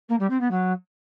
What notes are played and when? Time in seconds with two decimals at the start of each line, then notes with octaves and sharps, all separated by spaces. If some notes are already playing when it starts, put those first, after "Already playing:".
0.09 A#3
0.19 G3
0.30 C4
0.40 B3
0.51 F#3